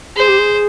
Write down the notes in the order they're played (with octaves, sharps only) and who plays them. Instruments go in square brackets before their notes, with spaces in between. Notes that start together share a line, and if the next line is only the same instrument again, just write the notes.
[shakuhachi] G#4 [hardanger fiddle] C5
[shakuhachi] G4
G#4